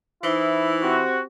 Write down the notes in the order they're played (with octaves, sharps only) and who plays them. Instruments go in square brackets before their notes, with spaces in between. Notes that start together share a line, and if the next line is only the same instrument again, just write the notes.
[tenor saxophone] E3 [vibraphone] D#4 C5 [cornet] E4
[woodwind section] C4 F#4 [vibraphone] G4